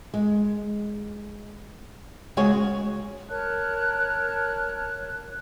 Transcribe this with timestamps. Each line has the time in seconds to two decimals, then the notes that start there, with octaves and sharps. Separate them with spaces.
0.14 G#3
2.37 C#3 G#3 F#4 G#4 C#5
3.29 A#4 C#5 A5 F#6